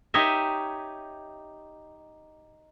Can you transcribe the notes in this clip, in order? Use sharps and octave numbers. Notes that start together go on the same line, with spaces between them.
D#4 G4 C#5 D#5 E5